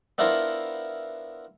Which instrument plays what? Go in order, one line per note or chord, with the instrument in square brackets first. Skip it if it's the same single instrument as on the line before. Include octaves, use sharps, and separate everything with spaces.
[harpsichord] B3 D4 E4 F4 A#4 C5